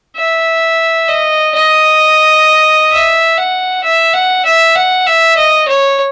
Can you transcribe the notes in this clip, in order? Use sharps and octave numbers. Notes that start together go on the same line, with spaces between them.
E5
D#5
D#5
E5
F#5
E5
F#5
E5
F#5
E5
D#5
C#5